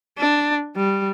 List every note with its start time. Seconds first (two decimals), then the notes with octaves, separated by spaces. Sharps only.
0.18 D4
0.76 G3